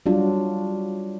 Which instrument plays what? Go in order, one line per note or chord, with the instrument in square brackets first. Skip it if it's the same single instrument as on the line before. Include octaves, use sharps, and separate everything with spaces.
[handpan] F#3 G3 D4 F4